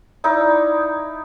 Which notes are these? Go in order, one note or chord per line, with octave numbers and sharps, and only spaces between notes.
D#4 E4 D5